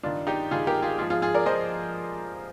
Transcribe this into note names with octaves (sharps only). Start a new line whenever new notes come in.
G2 D#3 D4 F4
D#4 G4
G2 D#3 F4 G#4
G4 A#4
F4 G#4
G#2 F3 F4 G#4
F4 G#4
F4 G#4
A#4 D5
F3 C5 D#5